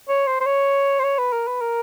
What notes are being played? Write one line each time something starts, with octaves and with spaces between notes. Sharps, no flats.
C#5
C5
C5
C#5
C5
C#5
B4
A#4
B4
A#4